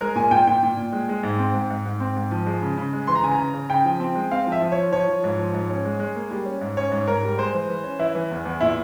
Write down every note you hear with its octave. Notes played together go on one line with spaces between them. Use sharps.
G#3 A#4
A#2 G#5
A#2 G5
A#2 G5
A#2
A#2
G#3
G#3
G#2
C4
G#2
G#2
G#2
C4
G#2
F3
G#3
C#3
C#3
G#3
E3 C6
A#5
C#3 G#5
A#5
C#3
C#3
C#3 G5
F3
C4
G#3
C4 F5
F3
E5
F3
C#5
F3
F3 C#5
F3
G#2
F3
G#2
C#4
G#3
G#3
A#3
G3
C#4
G#2
C#4 C#5
G#2
G#2 A#4
G3
G#3 C5
E3
E3
C#4
E3 E4
E3
E2
E2
A#2 E4